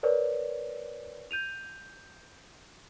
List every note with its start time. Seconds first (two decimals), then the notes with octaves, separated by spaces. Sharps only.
0.03 A#4 B4 C#5 D5
1.31 G6 D#7 F7